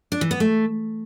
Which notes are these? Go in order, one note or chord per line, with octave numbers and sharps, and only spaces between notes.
D4
E3
B3
A3